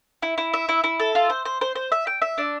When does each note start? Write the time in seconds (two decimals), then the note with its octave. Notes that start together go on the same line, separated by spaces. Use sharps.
0.22 E4
0.38 E4
0.54 E5
0.69 E4
0.84 E4
1.00 A4
1.15 F4
1.30 C5
1.45 C5
1.61 C5
1.75 C5
1.92 E5
2.07 G5
2.22 E5
2.38 D4